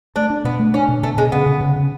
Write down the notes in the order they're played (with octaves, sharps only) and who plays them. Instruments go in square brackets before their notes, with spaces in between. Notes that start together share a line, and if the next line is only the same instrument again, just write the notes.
[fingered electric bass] A3 [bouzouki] D4
[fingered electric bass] D4
[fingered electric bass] B2 [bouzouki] B3
[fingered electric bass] A3
[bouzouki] C#4 [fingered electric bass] D4
[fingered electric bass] B2
[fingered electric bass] B2 [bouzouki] A3
[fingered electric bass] B2 [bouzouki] G#3
[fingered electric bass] C#3 [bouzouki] B3
[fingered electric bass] C#3
C#3
C#3